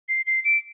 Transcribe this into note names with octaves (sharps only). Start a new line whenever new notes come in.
C7
C7
D7